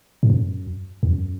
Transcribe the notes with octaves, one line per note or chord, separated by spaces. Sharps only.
G#2
F#2
E2
F#2